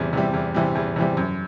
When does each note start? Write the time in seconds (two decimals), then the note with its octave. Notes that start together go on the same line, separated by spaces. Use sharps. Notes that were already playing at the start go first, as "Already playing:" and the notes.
Already playing: E2 C3 E3 G3
0.13 C3 E3 G3
0.33 E2
0.54 C3 E3 G3
0.75 E2
0.96 C3 E3 G3
1.17 F#2